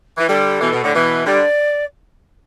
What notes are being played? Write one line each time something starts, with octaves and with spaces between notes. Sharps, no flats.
E3
D3 G3 A4
B2 E3
B2
A2 D3
B2 E3 B4
D3 G3 D5